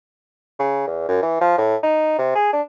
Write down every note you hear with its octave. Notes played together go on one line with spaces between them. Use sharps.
C#3
E2
F#2
E3
F3
A2
D#4
C3
G#4
D4